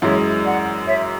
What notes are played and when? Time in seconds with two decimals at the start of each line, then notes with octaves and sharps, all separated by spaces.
0.01 F#2 E3 G#3 C#5 E5
0.44 D5 F#5
0.86 C#5 E5